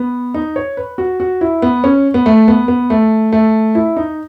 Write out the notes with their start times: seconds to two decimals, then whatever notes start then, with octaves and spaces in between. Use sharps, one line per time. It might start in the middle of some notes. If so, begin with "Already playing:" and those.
Already playing: B3
0.34 D#4
0.56 C#5
0.77 B4
0.98 F#4
1.20 F#4
1.41 E4
1.62 B3
1.84 C#4
2.14 B3
2.26 A3
2.48 B3
2.68 B3
2.90 A3
3.32 A3
3.75 E4
3.97 D#4